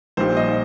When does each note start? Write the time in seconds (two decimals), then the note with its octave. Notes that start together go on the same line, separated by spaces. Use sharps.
0.17 A#1 A#2 G3 D#4 C5
0.37 D#5